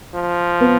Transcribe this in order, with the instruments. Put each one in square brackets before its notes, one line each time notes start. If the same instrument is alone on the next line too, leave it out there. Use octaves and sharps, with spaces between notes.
[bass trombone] F3
[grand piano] B3